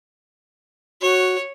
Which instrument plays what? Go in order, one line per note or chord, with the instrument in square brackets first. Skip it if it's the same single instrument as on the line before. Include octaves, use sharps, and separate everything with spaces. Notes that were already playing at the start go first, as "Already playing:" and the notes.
[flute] F#4 [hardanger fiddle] C#5